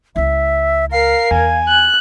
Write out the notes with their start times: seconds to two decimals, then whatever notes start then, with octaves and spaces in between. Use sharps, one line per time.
0.16 C#2 E4 E5
0.92 A#4 F5 C7
1.31 E2 G#5
1.68 F#6